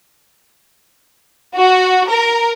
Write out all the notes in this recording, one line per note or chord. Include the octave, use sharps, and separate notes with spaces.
F#4
A#4